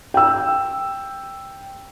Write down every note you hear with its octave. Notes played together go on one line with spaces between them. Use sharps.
G5 E6